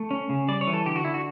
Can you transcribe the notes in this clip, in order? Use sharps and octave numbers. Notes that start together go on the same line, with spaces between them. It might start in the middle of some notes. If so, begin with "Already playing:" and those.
Already playing: A3
C#4
C#3
G3 D5
C#5
E3
A4
D3 G4
F#4
D3 E4
F#4